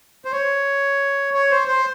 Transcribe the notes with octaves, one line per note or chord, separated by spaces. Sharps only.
C5
C#5
C#5
C5
C5